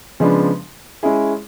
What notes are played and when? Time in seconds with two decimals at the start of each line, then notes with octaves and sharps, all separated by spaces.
0.20 C#3 F3 G#3 B3 D4
1.03 G#3 C#4 E4 G#4